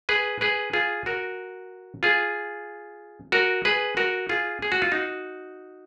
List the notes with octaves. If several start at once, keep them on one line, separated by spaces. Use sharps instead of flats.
G#4 B4
G#4 B4
F4 G#4
F#4 A#4
F4 G#4
F#4 A#4
G#4 B4
F#4 A#4
F4 G#4
G#4
F#4
F4
D#4 F#4